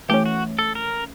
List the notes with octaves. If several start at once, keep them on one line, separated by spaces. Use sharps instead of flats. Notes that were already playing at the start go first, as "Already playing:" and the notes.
E3 A3 C#4 G4
F#4
A4
A#4